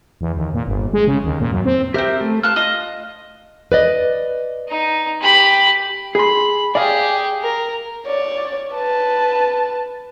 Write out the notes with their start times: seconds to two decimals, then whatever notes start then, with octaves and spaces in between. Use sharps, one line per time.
0.21 E2
0.36 D#2
0.54 A#2
0.67 G1
0.93 G#3
1.07 C#3
1.24 D#2
1.40 A#2
1.52 F#2
1.65 C4
1.94 C4 G4 A#4 E5 G6
2.21 A3
2.43 F4 A5 F6 F#6
2.56 F4 D#5 D#6
3.72 B4 D5 D#5
4.68 D#4
5.21 G4 B5
6.15 G#4 B5 C6
6.75 G4 G#4 D5 F5
7.42 A#4
8.06 C#5 D5
8.73 B4 A5